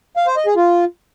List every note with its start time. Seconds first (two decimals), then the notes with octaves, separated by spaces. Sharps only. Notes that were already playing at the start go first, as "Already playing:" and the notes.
0.17 F5
0.27 C5
0.37 D#5
0.46 G#4
0.56 F4